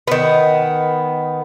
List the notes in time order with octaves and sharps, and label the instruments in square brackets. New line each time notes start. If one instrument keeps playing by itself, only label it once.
[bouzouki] D#3 B3